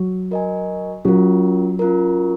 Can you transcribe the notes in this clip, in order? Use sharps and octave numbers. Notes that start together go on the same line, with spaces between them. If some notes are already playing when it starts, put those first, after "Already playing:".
Already playing: F#3
F#4 A#4 D#5 G#5
F#3 C#4 F4 A#4
C#4 F4 A#4